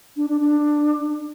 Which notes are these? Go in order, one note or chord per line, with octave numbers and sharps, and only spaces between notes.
D4
D4
D4